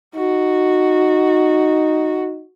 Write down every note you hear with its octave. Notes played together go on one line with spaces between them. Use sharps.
D#4 F#4